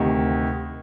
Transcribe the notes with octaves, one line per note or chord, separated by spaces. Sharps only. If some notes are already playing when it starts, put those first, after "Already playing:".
Already playing: D2 C3 D#3